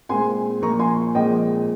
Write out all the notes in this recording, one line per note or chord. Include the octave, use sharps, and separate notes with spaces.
A#2 G#3 C4 G#5 C6
A#2 F3 A#3 A#5 C#6
G#5 C6
A#2 F3 G#3 C4 D#5 G5